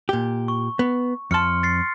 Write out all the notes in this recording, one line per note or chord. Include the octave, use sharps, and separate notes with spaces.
A#2 G4
C#6
B3
F2 A5 C6 F6 C#7
A6 C7